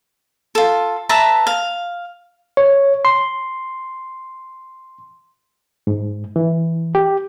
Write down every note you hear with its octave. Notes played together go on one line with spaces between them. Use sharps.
F4 A4
B4 E5 A5 A#5
F5
C#5
C6
G#2
E3
G4